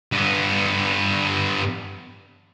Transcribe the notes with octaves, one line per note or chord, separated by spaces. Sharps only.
G2 B3